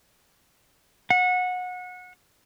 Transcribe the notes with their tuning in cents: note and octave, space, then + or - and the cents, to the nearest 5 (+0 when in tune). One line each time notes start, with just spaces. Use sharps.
F#5 -25